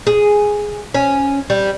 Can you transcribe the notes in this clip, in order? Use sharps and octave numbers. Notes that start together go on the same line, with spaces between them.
G#4
C#4
G3